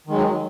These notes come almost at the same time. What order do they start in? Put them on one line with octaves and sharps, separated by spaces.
D#3 G#3 F#3